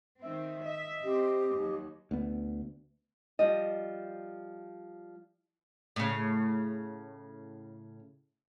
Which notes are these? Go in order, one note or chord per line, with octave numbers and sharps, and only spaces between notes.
D#3 C4 E5
D#5 E5
C4 G4
D#2 F#3
D2 B3
F3 G3 D#5
A2 C#3